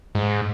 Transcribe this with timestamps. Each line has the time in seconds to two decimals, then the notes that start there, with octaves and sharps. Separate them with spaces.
0.15 G#2